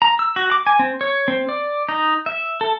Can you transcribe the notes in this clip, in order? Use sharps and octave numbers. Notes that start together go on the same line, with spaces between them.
A#5
E6
F#4
D6
G#5
C4
C#5
C4
D5
D#4
E5
A4